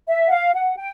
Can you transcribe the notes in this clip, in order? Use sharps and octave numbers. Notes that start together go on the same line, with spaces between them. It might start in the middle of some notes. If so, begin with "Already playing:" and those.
E5
F#5
F5
F#5
G5